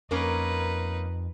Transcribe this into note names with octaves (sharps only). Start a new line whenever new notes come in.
F2 A#3 C#4 D#4 A#4 B4